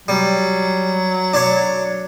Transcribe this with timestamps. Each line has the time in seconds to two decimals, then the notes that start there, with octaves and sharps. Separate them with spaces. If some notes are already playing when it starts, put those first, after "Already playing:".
0.08 F#3 G3
1.34 D4 C#5